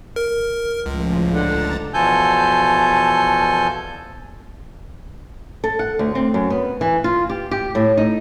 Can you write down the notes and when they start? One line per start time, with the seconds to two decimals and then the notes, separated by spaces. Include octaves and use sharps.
0.16 A#4
0.86 C#2 A2 C#3 F3
1.33 D3 A5 A#5 A6
1.94 E2 B2 F3 A4 G#5 G6
5.64 A4
5.79 F#5
5.99 D2
6.15 C4
6.34 F#2
6.50 B3
6.81 E3
7.04 F4
7.30 G4
7.51 G4
7.75 A2
7.97 D#4